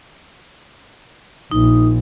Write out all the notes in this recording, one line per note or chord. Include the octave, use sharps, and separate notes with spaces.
A#1 D#4